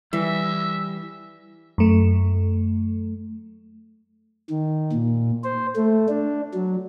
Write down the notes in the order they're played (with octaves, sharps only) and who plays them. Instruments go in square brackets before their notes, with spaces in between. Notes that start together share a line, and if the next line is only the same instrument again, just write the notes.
[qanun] E3 [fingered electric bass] G3 [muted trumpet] E5
[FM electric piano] F#2 A3
[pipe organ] D#3
A#2
C5
A3
D4
F#3